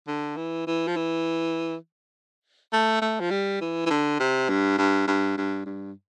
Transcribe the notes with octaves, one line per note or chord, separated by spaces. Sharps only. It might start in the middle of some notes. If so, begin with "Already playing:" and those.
D3
E3
E3
F3
E3
A3
A3
F3
G3
E3
E3
D3
C3
G2
G2
G2
G2
G2